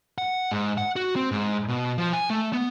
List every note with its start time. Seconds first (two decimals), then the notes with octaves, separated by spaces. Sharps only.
0.18 F#5
0.52 G#2
0.78 F#5
0.96 F#4
1.16 C4
1.32 G#2
1.68 B2
1.98 F3
2.13 G#5
2.30 A3
2.53 B3